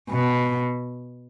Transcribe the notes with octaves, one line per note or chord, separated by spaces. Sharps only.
B2